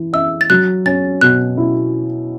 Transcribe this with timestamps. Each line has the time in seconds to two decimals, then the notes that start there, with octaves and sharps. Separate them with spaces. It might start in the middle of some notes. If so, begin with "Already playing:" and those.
Already playing: E3
0.13 E5 E6
0.41 A6
0.50 F#3 F#6
0.86 C#4 A6
1.21 B2 F#6
1.57 E4